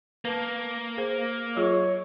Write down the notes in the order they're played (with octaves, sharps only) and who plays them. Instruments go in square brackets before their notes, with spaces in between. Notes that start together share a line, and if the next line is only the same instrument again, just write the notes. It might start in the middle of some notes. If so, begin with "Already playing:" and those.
[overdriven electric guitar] A#3 [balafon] B4 A5
[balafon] G#4 C5
[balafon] F#3 F4 G#4 [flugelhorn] C#5